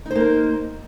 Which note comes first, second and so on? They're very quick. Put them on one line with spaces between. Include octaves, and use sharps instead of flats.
D#4 C5 A#3 A#4